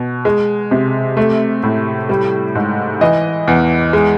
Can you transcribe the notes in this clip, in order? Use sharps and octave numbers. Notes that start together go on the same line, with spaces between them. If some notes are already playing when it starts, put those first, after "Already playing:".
Already playing: B2
G#3
C3
A3
A2
G3
G#2
E3 D#5
E2
G#3